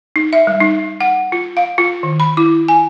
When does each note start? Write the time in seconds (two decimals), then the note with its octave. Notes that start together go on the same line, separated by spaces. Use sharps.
0.16 D#4
0.33 E5
0.47 G3
0.60 D#4
1.00 F#5
1.32 F4
1.57 F5
1.78 F4
2.03 D#3
2.20 B5
2.37 E4
2.68 G#5